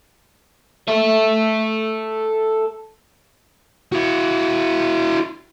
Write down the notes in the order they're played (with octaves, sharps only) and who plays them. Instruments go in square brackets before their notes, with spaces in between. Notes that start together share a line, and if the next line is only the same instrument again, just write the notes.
[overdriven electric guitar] A4 E5
[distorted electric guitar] E4 F#4